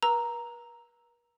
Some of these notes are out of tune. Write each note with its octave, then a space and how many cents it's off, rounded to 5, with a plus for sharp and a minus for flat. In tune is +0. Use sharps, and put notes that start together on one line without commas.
B4 -45 A#5 +0 E6 +0